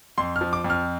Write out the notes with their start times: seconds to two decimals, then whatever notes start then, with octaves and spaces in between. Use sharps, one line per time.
0.18 F2 C6
0.36 F6
0.41 F3
0.53 D6
0.64 F2
0.70 F6